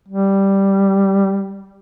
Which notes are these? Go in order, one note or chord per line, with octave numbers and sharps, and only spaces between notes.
G3